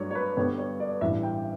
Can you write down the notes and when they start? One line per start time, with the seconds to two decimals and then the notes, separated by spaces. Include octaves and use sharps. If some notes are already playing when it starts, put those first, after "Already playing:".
Already playing: G2 F#3 A3 D4 C#5
0.11 C#5
0.15 B4
0.37 G2 D3 G3 B3 C#5
0.58 C#5
0.80 D5
1.01 A1 G2 E3 G3 D4 E5
1.23 G5